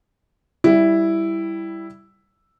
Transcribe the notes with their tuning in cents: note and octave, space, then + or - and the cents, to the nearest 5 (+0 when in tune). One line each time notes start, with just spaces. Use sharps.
G3 +0 E4 +0